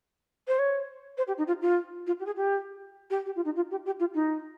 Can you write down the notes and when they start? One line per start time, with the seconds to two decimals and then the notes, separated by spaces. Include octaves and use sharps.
0.48 C5
0.59 C#5
1.18 C5
1.28 G4
1.38 D#4
1.47 F4
1.62 F4
2.07 F4
2.20 G4
2.26 G#4
2.36 G4
3.10 G4
3.26 G4
3.36 F4
3.45 D#4
3.56 F4
3.71 G4
3.86 G4
4.00 F4
4.14 D#4